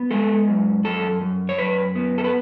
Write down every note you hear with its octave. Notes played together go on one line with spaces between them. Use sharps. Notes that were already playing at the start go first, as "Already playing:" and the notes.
Already playing: B3
G#3 A4
F#2
F#2 A4
F#2
C#5
F#2 B4
B3
A4
B4